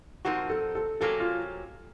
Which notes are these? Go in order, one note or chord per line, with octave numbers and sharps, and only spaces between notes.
A#2 F3 C4 D#4 F#4 A#4
A4
A4
C3 F#3 A#3 C#4 A4
F4